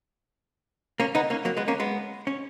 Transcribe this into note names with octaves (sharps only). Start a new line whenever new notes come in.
A#3 C#4
B3 D#4
A#3 C#4
F#3 A#3
G#3 B3
A#3 C#4
G#3 B3
C#4